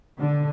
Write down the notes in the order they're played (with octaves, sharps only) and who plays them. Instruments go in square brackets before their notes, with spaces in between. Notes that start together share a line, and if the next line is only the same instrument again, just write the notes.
[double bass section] D3